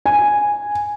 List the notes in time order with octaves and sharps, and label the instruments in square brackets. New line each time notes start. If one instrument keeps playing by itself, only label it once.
[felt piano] G#5